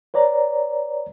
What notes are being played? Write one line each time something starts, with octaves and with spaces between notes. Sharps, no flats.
B4 C#5 D5 A#5